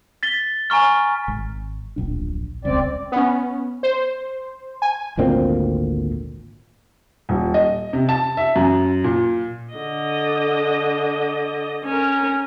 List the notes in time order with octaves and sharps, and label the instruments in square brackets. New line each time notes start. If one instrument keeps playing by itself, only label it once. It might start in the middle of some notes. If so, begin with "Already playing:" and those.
[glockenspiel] A6 B6 G7
G#5 A#5 C#6 F6
[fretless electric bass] G#1
D1 A#1 D4
[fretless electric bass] D#1 C#2 [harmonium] C4 D5
[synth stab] B3 C#4
C5
G#5
[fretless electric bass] G#1 D2 A#2 C4
[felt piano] D#1
D#5
C3
A5
E5
F#2
A#2
[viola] D3 D#5
C#4 A#4